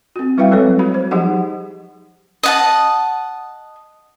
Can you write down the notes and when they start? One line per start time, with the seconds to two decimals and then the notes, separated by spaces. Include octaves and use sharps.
0.16 C4 F#4
0.38 G3 E4 B4 E5 F5 G5
0.51 F#3 G#3 C4 A4 B4 C#5
0.79 F#4 B5
0.94 C5
1.11 F3 F#3 D#4 G4 G#4 F#5
2.43 D#5 F#5 A5